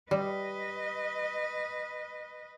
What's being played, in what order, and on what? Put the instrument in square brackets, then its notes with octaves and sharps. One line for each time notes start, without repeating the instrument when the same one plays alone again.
[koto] G3 [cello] B4 D#5